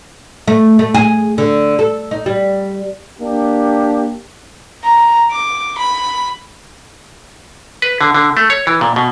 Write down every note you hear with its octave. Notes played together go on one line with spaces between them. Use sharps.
A3
A3
G#4
D3
A4
D#4
G3
A#3 D4 G4
A#5
D6
B5
B4
D3
D3
A3
C#5
E3
A#2
B2